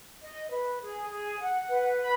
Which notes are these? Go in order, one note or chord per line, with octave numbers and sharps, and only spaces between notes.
D#5
B4
G#4
G#4
F#5
B4
B5